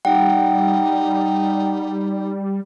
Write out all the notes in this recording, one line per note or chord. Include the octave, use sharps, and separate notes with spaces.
G3 D#4 F#5 G5